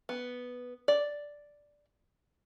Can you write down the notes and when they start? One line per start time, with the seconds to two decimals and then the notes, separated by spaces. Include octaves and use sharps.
0.09 B3
0.88 D5